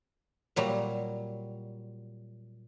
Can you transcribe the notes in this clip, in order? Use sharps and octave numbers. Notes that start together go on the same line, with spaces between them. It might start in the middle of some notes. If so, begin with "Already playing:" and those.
A#2 F#3 G3